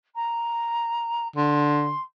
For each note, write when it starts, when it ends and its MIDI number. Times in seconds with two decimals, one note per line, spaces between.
0.15 1.27 82
1.36 1.94 50
1.36 2.01 84